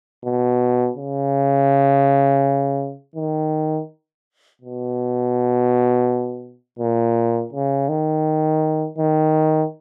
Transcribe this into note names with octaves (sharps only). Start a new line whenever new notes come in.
B2
C#3
D#3
B2
A#2
C#3
D#3
D#3